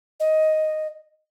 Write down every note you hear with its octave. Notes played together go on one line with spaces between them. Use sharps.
D#5